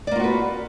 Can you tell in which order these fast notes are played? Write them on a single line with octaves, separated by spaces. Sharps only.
D5 A#3 F4 F#4 B4